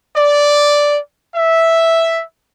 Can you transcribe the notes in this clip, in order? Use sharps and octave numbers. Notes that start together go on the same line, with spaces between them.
D5
E5